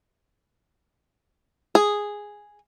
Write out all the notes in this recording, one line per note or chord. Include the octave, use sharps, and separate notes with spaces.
G#4